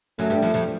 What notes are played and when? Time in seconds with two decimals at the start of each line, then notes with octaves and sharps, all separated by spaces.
0.19 F#2 F#3 A3
0.30 G2 G3
0.42 F2 F3
0.54 F2 F3